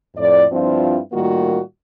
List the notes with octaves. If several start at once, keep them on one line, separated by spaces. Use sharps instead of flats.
F2 A2 D5
G2 F3 C4 D4 E4 F4
A2 D#3 G3 A#3 F4 F#4